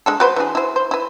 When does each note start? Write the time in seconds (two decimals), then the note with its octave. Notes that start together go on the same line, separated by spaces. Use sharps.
0.06 G#3 D4 A4
0.20 F#4 B4 C5
0.36 E3 D4 G#4
0.55 E4 C5
0.76 C5
0.91 E4 B4